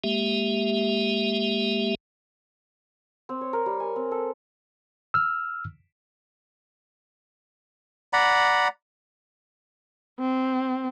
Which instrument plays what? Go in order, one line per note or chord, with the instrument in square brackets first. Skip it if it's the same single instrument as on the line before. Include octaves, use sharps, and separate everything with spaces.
[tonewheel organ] G#3 A#3 G4 E5
[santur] C4
C#5
A#4
G3
G#5
C4
A4
[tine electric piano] E6 F6
[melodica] D5 F#5 A#5 B5
[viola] C4